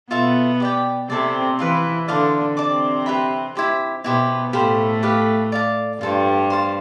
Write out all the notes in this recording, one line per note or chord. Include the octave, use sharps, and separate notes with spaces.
B2 B3 F4 A4 E5
G4 D5 G5
C3 C4 E4 A4 D5
E3 E4 B4 F5 C6
D3 D4 D5 F5 C6
C3 C4 D5 A5 D6
G4 B4 E5 B5
E4 G4 C5
B2 B3 E4 G4 C5
A2 A3 G4 C5 F5 B5
G4 B4 F5
D5 F5 A5
G2 G3 F4 A4 C5
C5 F5 A5